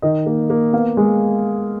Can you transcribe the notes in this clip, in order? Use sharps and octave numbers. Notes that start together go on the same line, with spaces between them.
D#3 D#5
A#3
A#3
B3 F5
G#3